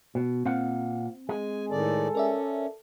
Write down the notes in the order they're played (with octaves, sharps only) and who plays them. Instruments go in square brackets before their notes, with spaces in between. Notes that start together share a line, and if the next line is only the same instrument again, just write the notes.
[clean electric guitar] B2
[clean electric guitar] A#2 F5 F#5 [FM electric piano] C4
[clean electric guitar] G#3 [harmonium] G#5
[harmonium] A2 D#3 D5 [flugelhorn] A4
[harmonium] C#4 [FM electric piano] A#4 D5 E5